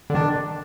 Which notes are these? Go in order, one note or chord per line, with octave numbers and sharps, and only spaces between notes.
D3
D#3 D4